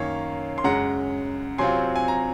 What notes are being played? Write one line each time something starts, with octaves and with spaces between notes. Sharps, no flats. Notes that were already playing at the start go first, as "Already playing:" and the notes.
Already playing: F#2 D#3 A#3 C#4 C#5 F5
C6
F#2 C#3 G#3 F#5 A#5
C3 F#3 C4 F4 G#5 C6
G#5
A#5